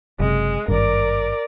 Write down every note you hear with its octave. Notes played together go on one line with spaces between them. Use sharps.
F#1 C3 G#3
G#1 G2 A#4 D5